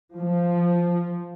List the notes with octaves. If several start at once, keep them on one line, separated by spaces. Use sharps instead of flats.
F3